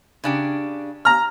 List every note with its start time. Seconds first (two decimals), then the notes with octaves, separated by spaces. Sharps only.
0.24 C#3 D4 G4
1.05 A#5 F6